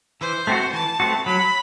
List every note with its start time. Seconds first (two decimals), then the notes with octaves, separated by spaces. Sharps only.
0.21 E3 C5
0.47 A3 C4 F#4
0.73 E3 A5
1.00 A3 C4 F#4
1.26 F#3 B5